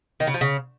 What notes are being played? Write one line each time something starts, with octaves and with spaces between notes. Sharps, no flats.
D#3
C#3
F3
C#3